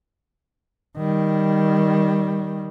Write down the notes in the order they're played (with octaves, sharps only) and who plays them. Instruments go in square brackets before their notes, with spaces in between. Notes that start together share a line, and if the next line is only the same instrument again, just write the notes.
[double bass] D#3 G3